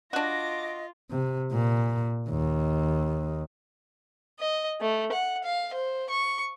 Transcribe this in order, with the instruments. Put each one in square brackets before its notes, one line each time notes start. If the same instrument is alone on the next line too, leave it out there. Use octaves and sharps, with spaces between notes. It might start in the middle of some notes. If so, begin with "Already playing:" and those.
[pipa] D4 F#4 [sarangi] F4 [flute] D#5 [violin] D6 A#6
[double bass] C3
A#2
D#2
[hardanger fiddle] D#5
A3
F#5
F5
C5
C#6